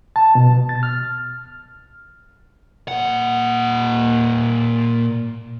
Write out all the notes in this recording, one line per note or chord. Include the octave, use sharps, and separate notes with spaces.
A5
B2
A6
F6
A#2 F#5